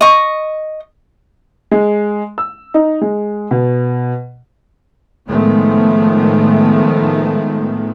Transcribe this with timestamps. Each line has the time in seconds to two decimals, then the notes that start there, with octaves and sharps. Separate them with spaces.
0.01 D#5 C#6
1.71 G#3
2.38 E6
2.74 D#4
3.01 G#3
3.51 B2
5.29 A2 D#3 F3 G#3 A3 B3